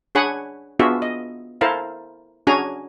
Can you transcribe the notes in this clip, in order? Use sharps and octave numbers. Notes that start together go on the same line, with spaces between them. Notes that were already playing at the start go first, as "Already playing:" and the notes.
D4 G#4 C#5 F#5 G#5 B5
B3 D4 F4 F#4 G#4 E5
D#5
E4 A4 A#4 C5 F5 A5
C#4 D4 F#4 G#4 G#5 A#5